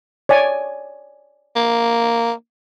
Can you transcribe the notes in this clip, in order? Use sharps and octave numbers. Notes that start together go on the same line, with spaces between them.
C#5 D5 G#5
A#3